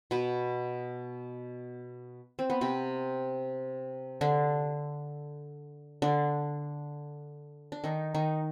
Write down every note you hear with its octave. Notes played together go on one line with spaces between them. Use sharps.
B2 B3
C4
B3
C3 C4
D3 D4
D3 D4
D4
D#3 D#4
D#3 D#4